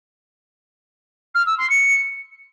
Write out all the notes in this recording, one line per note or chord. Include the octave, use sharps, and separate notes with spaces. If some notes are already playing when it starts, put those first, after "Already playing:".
F6
E6
C6
C#7